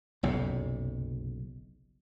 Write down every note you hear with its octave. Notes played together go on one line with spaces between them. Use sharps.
F#1 B1 F2 C3